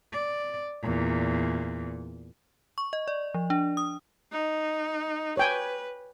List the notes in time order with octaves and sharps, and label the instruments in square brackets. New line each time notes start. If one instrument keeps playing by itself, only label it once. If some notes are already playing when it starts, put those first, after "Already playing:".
[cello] D5
E2 A#2
[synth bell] C#6
D#5
D5
F3
D4
D#6
[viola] D#4
[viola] B4 [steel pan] C#5 G5 G#5